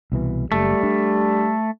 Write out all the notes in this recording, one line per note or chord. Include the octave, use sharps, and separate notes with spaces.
C2 B2 E3
F#1 G3 A3
D4